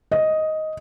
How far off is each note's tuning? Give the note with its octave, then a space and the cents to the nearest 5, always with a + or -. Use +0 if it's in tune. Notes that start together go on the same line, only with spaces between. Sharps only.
D#5 +5